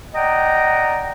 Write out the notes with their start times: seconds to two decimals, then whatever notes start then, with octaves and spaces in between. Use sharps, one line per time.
0.14 D5 D#5 F#5 G5 A#5